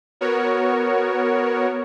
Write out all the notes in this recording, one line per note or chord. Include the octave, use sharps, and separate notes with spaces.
B3 F#4 A#4 C#5